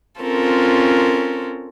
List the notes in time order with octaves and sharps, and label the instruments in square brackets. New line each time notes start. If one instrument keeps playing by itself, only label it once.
[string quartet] C4 C#4 F4 A4 A#4